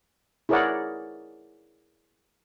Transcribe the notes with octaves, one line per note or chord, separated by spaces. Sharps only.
E4 G#4 A#4 C#5 D5 F#5